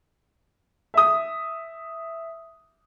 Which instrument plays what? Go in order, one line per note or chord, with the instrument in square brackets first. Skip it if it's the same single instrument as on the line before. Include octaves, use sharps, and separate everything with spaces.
[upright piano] E5 D#6